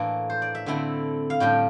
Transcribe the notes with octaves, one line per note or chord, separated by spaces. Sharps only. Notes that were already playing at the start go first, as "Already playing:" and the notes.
Already playing: A2 E3 A#3 D4 F5
C5
D5
E5
D3 A3 C4 E4
F5
A2 G3 D4 G5